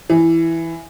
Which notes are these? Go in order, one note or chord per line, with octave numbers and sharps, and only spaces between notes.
E3